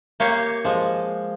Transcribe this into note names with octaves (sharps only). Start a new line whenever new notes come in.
A#3 G4 C#5 F5
F3 G#3